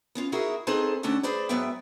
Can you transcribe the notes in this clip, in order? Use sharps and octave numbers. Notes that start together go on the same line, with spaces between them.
B3 C#4 F4
D#4 E4 F#4 G#4 A#4
C4 D#4 G#4 A4 B4 C5
D2 A3 C#4 D4 F#5 A5
G#4 B4 C5 D5
G#2 F#3 B3 B4 E5 G5